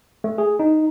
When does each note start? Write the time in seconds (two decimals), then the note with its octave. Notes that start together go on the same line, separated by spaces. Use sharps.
0.24 A3
0.38 G#4
0.59 D#4